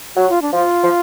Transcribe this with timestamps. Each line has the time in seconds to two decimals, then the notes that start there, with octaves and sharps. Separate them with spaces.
0.16 F#3 F#4
0.30 F4
0.42 D4
0.53 F3 F4
0.83 F3